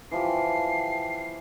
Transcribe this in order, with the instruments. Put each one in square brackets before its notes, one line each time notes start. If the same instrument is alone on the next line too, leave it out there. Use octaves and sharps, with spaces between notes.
[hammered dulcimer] E3 F3 G4 [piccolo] C7